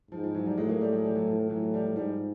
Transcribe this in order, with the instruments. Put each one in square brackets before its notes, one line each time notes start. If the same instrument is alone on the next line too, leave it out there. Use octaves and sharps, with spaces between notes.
[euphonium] G#2 [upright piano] F3
[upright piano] F3
E3 F#3
F3 G3
[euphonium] A2 [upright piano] F#3 G#3
[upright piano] G#3 A#3
G3 A3
F#3 G#3
F3 G3
E3 F#3
F3
F3
[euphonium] A2 [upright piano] E3 F#3
[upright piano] F3 G3
[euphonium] G#2 [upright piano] F3 G3